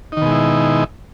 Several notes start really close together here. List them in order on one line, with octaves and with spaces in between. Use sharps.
D#4 D#3 B2 G#3 E4